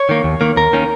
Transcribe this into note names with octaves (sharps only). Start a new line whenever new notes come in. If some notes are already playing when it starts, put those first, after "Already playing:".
Already playing: C#5
D#3 A#3
D#2
D#3 A#3
D#2 A#4
D#3 A#3 C#4